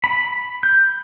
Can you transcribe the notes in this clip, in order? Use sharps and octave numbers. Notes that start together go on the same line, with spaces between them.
B5
G6